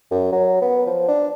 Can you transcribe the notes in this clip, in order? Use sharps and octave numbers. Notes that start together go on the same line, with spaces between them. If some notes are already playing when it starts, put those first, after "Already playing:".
F#2
F#3
B3
F3
D4